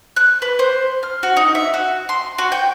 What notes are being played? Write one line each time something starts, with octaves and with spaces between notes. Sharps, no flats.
F#6
B4
C5
F6
F#4
D#4
E5
F#4
C6
F#4
G5